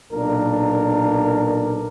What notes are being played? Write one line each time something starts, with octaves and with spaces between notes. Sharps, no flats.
B1 A#2 D4 A#4